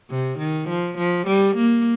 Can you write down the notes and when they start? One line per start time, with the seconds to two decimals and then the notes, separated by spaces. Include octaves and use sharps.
0.10 C3
0.39 D#3
0.69 F3
0.98 F3
1.27 G3
1.56 A#3